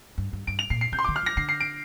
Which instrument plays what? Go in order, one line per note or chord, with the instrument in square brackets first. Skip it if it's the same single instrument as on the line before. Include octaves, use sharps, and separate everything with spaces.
[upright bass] G2
G2
[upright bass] G2 [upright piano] D7
[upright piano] F7
[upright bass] A#2 [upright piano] C7
[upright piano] C7
[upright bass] C3 [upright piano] G6
[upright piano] C6
[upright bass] D3 [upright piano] D6
[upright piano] F6
[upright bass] F3 [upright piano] A#6
[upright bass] D3 [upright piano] C7
[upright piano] C7
D7